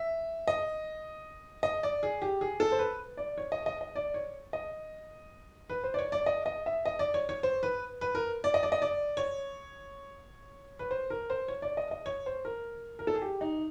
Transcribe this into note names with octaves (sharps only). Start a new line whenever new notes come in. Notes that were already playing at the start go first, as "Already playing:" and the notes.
Already playing: E5
D#5
D#5
D5
G#4
G4
G#4
A4
C5
B4
D5
C#5
D#5
D#5
D#5
D5
C#5
D#5
B4
C5
D5
C#5
D5
D#5
D#5
E5
D#5
D5
C#5
C#5
C5
B4
B4
A#4
D5
D#5
D5
D#5
D5
C#5
B4
C5
A#4
C5
C#5
D5
D#5
D#5
C#5
C5
A#4
A#4
A4
G#4
G4
D#4